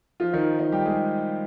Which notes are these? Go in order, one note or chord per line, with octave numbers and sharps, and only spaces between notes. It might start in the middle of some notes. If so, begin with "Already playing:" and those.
F3 F4
D#3 D#4
D#3 D#4
G3 G4
G#3 G#4